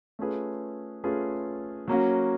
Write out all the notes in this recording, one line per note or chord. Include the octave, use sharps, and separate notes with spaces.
A3 C#4 F4 G#4 B4
A3 C#4 F4 G#4 B4
F#3 A#3 C#4 F#4